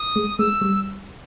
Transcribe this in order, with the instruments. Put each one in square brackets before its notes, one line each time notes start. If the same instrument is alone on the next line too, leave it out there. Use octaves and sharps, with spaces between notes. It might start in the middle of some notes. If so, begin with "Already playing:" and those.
Already playing: [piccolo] D#6
[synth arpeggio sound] G#3
[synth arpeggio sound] G#3 [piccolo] E6
[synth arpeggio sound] G3